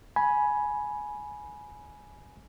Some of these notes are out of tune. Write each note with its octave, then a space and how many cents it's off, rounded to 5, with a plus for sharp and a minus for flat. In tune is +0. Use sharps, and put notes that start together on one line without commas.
G#5 +10 B5 -15